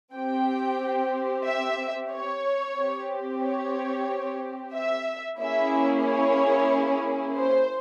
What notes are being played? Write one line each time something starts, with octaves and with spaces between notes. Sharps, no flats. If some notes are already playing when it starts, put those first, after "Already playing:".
C4 G4 G5
E5
C#5
C4 G4
C#5
E5
A#3 C#4 E4 G#4 E5
C#5
C5